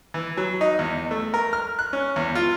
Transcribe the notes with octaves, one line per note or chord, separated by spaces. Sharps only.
E3
F#3
D#4
E2
A3
A#4
F6
F#6
C#4
E2
F4